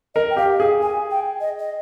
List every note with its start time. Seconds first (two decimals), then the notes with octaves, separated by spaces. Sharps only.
0.15 A#4 D#5
0.30 G5
0.37 G4 F5
0.59 G#4 F5
0.82 G#5
1.11 G5
1.41 D#5
1.59 D#5